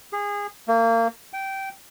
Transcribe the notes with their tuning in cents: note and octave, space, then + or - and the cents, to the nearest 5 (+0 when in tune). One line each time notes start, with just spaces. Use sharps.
G#4 -25
A#3 -30
G5 -15